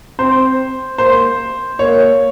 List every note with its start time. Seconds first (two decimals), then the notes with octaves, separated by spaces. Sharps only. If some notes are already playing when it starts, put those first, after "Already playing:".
0.19 C4 C5
0.98 A#3 C5
1.79 A#3 C#5